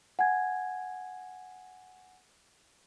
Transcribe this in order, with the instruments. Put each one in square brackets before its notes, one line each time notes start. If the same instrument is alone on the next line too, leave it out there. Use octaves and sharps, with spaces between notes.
[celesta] F#5 G#5 G#6